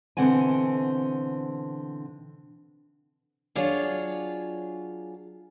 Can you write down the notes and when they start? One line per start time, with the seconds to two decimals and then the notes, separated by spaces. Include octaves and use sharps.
0.17 B2 D3 E3 C4 F#5 G#5
3.56 F#3 D4 F4 G#4 C#5